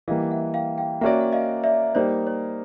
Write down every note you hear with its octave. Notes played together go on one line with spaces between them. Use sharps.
E3 G3 A#3 D#5 F5
E5 F#5
F5 G5
F5 G5
A#3 C#4 F#4 A#4 D5 E5 F#5
F#5
D#5 F5
D5 E5
G3 A#3 D#4 C5 D5
C#5